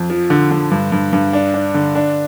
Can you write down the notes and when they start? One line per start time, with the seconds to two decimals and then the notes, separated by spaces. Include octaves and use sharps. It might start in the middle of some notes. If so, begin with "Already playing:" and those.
Already playing: F2
0.10 F3
0.30 D3
0.51 D3
0.71 G2
0.92 G2
1.13 G2
1.33 D4
1.54 D4
1.74 D3
1.95 D4